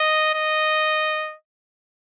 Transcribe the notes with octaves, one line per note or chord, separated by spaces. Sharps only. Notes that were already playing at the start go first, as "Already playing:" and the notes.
Already playing: D#5
D#5